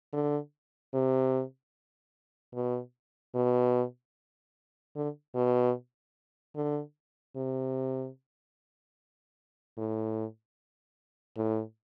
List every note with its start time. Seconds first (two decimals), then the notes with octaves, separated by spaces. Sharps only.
0.13 D3
0.93 C3
2.54 B2
3.35 B2
4.96 D3
5.35 B2
6.55 D3
7.36 C3
9.77 A2
11.37 A2